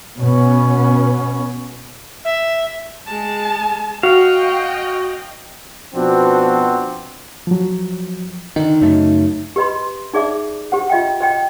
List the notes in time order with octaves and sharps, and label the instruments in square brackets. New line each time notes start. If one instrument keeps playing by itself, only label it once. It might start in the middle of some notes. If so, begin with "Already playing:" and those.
[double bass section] B2 B3 C#4
[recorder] E5
[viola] G#3 A5
[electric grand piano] F#4 [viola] D#5 G5 [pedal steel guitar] F5
[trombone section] B2 F3 B3 C4 D4 F#4
[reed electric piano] F3 F#3
[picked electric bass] D3 D#3 [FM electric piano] D#4
[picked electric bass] F#2 C#3 A3
[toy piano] G4 B4 D#5 B5 C6
D#4 G#4 D5 E5 D6
G4 C5 F#5
F4 D#5 E5 G5
C5 D#5 G5